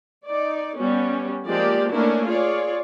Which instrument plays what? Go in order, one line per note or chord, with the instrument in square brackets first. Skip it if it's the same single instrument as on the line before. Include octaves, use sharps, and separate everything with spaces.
[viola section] D#4 D5
G3 B3 C#4
F3 G#3 A#3 G4 D5
A3 A#3 C#4 D4 E4 A#4
F4 G#4 C#5 D5